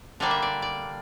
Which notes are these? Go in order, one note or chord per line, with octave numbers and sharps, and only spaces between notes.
D3 G3 A#3 D4 D5
E5
D5
D5